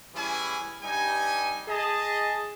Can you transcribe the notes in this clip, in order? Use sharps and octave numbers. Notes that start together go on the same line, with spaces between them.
E3 G3 C#4 E4 G#4 G#5
G2 G3 D#4 G#5
G#4 D#5 A5